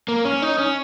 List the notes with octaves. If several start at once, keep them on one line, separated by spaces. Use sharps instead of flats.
A#3
C#4
D#4
C#4